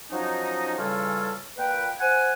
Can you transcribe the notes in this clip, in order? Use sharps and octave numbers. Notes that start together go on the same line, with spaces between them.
F3 F#3 C#4 D#4
C#3 E3 G3 C#4 F4 A4
A#2 B4 G5
C5 F#5 G#5